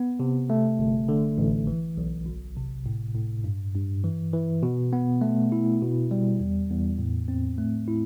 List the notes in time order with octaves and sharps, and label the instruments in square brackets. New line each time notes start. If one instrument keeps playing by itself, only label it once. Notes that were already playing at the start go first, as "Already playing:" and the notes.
Already playing: [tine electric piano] B3
C3
A3
G1
D3
A1
E3
B1
G1
C3
A2
A2
G2
G2
E3
E3
B2
B3
A3
E4
B2
G3
E2
E2
A2
C4
A3
E4